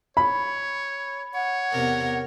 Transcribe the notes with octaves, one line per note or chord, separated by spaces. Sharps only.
C#5 B5
C#5 F#5
E2 C3 A#4